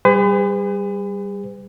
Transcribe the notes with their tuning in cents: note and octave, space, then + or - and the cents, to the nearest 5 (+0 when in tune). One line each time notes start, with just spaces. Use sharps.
G3 -5 G#4 -40 B4 +40